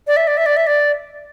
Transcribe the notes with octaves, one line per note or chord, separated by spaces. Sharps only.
D5
E5
D5
E5
D5
E5
D5